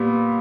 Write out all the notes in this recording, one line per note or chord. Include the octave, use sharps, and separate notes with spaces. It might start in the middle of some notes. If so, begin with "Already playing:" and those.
Already playing: A#2 G3 B3